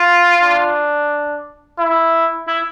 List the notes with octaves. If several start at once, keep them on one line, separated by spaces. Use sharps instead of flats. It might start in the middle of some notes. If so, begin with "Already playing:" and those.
Already playing: F4
D4
E4
E4